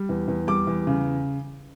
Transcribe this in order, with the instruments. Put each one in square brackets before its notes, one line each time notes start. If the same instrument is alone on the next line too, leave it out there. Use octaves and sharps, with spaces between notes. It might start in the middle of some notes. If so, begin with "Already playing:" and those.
Already playing: [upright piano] G3
E2
E2
G3 D6
E2
C#3